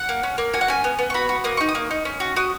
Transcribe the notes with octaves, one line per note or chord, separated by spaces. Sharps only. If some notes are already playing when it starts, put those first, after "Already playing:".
Already playing: F#5
A#3
C#4
A#3
F#4 G#5
F#5
C#4 G#5
B3
B3
C#6
F#4 B5
F#4
A#3 D#6
D#4 C#6
D#6
A#3
D#4
C#4
F#4
F#4 D#6